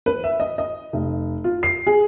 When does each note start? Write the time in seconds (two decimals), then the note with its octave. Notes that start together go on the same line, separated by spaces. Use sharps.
0.06 B4
0.24 E5
0.40 D#5
0.58 D#5
0.93 F1
1.44 F4
1.63 C7
1.87 G#4